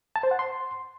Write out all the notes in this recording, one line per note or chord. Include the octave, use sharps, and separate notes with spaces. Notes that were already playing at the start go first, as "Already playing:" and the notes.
A5
C5
F#5
C6